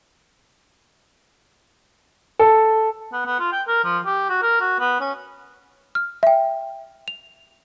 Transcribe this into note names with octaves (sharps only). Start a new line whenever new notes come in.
A4
B3
B3
F4
G5
A#4
F3
G4
F#4
A#4
F#4
B3
C#4
F6
E5 G5
F7